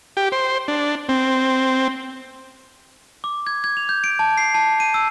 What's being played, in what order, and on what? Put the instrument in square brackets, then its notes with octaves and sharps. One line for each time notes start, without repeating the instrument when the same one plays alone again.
[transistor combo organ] G4
C5
D4
C4
[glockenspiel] D6
G#6
G#6
F7
G6
D7
A5
C7
A5
D#7
E6